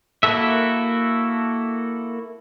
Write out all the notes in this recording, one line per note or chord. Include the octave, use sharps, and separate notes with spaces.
A#3 E4 F#4 A4 E5